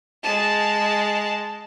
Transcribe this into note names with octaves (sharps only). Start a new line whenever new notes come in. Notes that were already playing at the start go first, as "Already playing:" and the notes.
G#3 A5